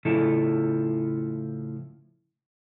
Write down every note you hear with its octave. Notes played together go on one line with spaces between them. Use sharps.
A2 C#3 F3 E4 A4